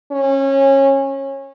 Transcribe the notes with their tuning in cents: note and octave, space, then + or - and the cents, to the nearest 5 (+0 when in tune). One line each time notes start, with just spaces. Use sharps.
C#4 -25